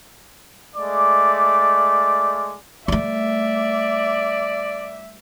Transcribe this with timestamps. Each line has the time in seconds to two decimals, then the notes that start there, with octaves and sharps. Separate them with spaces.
0.76 G#3 A3 D5 D6
2.88 G3 A3 D5 E5